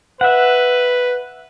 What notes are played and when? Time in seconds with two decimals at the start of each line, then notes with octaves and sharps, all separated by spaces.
0.21 B4 E5 F#5